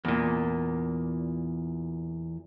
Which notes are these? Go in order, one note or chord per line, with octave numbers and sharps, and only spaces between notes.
E2 A#2